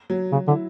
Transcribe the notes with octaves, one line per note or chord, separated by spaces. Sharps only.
F#3
C#3 F#3
D3 E4